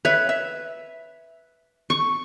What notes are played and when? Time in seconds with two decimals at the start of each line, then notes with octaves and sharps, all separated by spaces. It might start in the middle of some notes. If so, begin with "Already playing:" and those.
0.05 B4 C#5 E5
0.29 E5
1.90 C#6